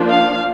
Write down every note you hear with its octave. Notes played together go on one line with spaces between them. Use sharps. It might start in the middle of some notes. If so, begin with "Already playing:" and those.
Already playing: F3 A#3 D4
F5